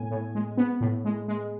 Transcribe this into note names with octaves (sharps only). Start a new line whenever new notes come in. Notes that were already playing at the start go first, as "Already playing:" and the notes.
Already playing: A2 B3 G#5
A2
G#3
B3
A2
G#3
G#3